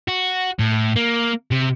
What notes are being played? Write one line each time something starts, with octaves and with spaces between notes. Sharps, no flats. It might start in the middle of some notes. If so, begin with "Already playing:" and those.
F#4
A2
A#3
C3